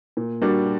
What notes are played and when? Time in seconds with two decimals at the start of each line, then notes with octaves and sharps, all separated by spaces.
0.17 A#2
0.41 G3 A#3 D4 F#4